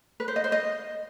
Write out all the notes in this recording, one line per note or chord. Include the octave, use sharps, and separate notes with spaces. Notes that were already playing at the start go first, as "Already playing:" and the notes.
B4
C5
D#5
C5
D#5